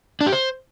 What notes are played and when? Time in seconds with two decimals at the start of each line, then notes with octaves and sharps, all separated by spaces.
0.21 D4
0.27 G4
0.32 C5